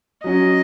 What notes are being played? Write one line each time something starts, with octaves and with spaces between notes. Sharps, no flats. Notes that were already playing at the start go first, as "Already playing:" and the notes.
F#3 C#4 F#4 D#5